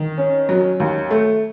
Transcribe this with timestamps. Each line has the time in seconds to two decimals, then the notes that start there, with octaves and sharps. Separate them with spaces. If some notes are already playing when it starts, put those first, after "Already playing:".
Already playing: D#3
0.18 C#4
0.49 F#3
0.80 D#2
1.10 A3